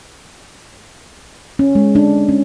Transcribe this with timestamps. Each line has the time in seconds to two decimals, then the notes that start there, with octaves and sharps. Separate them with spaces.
1.59 C#4
1.75 G#3
1.95 D4
2.29 C#4